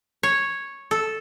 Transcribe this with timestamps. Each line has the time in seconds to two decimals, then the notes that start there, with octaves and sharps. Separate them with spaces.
0.23 C#5
0.91 A4